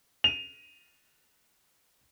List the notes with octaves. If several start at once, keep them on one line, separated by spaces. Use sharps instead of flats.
D#7 F7